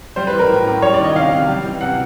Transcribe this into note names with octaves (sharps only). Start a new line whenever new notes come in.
G3 C5
B4
E3
A#4
A2
A2
G3 C#5
D5
D#3 D#5
C3 F5
C3
G3
E3
C3 F#5